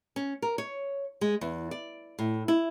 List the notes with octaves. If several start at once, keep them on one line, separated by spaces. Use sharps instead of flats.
C#4
A#4
C#5
G#3
E2
D5
A2
E4